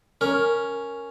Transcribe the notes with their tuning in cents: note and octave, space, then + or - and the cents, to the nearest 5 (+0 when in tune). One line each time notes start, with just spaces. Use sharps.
C#4 +0 A#4 +0